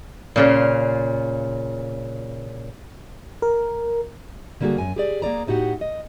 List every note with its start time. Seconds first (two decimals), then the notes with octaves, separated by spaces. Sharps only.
0.36 A#2 C#3 F4
3.42 A#4
4.60 D3 G3 A#3 F4 F#4 G#4
4.78 F#2 G#5
4.96 G4 G#4 D5
5.22 A#3 G#4 D5 A#5
5.47 A2 D#4 F#4 G4 F#5
5.81 D#5